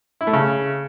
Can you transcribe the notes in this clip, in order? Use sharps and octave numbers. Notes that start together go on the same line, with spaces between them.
E4
A3
C#3